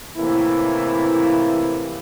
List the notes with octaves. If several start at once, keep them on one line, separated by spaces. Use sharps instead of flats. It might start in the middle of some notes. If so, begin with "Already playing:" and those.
A2 C3 E3 A#3 E4